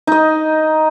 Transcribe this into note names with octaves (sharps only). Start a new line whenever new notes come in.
D#4 D#5